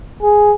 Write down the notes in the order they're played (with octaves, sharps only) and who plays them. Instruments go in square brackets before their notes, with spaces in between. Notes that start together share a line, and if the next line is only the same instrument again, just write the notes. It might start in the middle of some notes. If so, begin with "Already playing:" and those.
[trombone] G#4